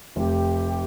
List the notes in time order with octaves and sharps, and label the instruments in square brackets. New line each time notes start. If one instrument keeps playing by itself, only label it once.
[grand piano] F1 [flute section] G4